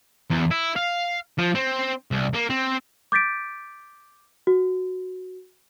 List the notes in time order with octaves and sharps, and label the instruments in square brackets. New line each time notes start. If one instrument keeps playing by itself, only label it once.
[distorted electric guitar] E2
E4
F5
F3
C4
C2
A#3
C4
[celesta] D6 G6 A6 B6 D7
F#4